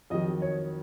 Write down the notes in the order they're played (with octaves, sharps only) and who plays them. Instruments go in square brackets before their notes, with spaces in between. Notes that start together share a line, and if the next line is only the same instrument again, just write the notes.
[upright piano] F2 D#3 F#3 D#5
C#5